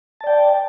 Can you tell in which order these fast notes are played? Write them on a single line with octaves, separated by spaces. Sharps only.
A5 D5 G5